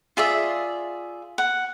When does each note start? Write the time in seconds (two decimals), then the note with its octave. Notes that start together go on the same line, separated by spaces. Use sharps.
0.17 F4 G#4 D5 E5
1.38 F#5